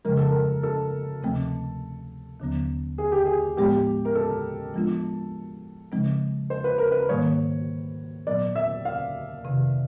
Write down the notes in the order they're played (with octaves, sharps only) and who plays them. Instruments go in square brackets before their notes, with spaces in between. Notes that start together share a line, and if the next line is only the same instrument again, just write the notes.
[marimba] F2 C#3 F3 G#3 [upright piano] A#4
[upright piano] A4
A#4
A4
[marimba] D2 C3 F3 A3 C4
D#2 D3 F#3 B3
[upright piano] G#4
G4
G#4
[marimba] A2 F3 G#3 B3 [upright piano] G4
[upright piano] A#4
A4
[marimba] F3 G#3 B3 D4 F4
C#3 F3 G#3 C4 D#4
[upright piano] C5
B4
A#4
B4
[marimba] G#2 D#3 G3 A#3 [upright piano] C#5
[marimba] A#2 F#3 B3 [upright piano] D5
[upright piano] E5
F5
[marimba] F2 C3 D#3